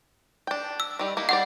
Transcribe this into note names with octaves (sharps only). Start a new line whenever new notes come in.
D4 G5
E6
D#3 G3
A#3 D#4 E4
D#3 G3 D5 F#5